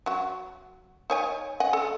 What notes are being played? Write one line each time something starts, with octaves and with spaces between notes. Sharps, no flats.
F#3 F#4
D#4 C#5 G#5
D#5 F#5 G#5
A4